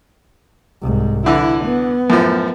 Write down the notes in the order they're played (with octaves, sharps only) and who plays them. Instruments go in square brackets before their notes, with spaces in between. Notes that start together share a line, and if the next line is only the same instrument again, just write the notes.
[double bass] C2 G#2
[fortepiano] D3 E3 [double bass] E4
[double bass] B3
[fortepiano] F#2 A2 F3